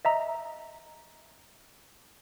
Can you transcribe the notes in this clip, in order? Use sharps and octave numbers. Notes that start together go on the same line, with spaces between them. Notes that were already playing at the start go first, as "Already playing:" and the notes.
D#5 E5 A#5